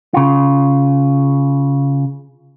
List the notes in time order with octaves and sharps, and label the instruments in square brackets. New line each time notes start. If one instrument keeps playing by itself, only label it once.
[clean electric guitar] C#3 F4